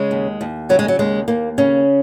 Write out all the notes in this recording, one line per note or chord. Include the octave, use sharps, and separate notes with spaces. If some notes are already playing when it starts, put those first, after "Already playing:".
Already playing: C#3 G#3
D#2
D#2
C#3 F#3
G#3
F#3
D#2 G#3
D#2 A#3
C#3 C#4